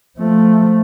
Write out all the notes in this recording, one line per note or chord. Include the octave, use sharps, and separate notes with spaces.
F3 A3